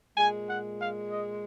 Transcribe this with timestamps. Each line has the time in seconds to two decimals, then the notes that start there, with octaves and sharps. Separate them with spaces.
0.16 A#2 G#3 G#5
0.49 F#5
0.80 F5
1.11 D#5